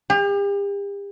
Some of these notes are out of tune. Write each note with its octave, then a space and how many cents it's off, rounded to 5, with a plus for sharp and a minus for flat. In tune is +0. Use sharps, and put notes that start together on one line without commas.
G4 +40